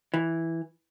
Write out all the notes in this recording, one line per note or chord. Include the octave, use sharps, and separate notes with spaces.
E3